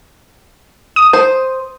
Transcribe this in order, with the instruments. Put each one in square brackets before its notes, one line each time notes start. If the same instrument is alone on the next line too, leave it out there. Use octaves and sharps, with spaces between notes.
[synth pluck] D#6
[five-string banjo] C5